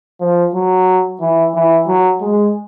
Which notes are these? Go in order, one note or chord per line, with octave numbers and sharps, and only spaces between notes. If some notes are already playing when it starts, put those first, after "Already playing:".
F3
F#3
E3
E3
F#3
G#3